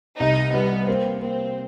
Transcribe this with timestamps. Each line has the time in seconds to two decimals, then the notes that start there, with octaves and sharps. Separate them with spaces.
0.20 C2 D#4
0.54 G3 B3
0.88 A#3 C4
1.21 A#3 C4